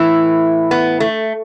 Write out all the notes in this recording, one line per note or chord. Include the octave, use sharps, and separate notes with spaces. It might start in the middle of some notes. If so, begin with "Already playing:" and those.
Already playing: A2 E3 E4
B3
A3